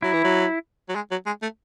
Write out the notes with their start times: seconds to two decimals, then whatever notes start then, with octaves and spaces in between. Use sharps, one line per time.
0.02 F#3 E4
0.13 E3
0.24 F#3
0.89 F#3
0.95 G#3
1.11 F#3
1.26 G#3
1.42 A3